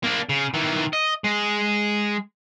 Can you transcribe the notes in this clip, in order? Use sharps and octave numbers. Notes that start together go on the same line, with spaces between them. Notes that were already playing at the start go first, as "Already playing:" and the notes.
A#3 D4
C#3
D#3 E3
D#5
G#3